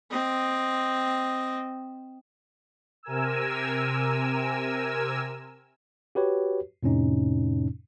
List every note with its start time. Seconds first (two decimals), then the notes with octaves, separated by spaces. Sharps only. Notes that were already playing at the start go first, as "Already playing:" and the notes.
0.11 C4 D#5
3.03 C3 A#4 G#5 E6
6.15 F#4 G4 B4 C#5
6.83 F2 A2 C3 C#4 D#4